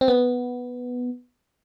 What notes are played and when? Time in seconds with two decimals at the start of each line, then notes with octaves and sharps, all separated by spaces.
0.01 C4
0.08 B3